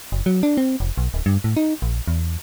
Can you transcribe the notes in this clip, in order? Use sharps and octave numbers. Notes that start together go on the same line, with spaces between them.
F#1
F#3
D4
C4
F1
B1
D1
G2
A2
D#4
A#1
E2